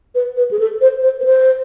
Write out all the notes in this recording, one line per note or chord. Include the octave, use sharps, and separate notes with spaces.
B4
B4
G#4
A4
C5
C5
B4
C5